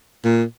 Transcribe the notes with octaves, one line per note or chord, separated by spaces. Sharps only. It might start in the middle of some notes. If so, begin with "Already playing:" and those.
A#2